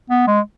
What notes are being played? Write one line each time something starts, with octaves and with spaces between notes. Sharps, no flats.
B3
G#3